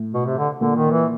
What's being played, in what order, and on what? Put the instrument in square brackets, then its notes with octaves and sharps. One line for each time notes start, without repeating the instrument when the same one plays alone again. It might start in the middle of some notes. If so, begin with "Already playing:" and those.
Already playing: [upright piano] A2
[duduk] B2
C3
D3
[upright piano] A#2 [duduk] D3
[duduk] D#3
E3